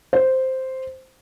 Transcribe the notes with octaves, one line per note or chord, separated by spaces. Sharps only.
C5